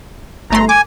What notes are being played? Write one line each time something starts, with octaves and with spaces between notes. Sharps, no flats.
G1 A3 A#5 C6
G#5 D6